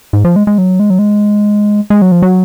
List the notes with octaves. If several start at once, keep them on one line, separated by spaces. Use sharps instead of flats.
G#2
F3
G#3
G#3
F#3
G#3
F#3
G#3
G#3
F#3
F3
F#3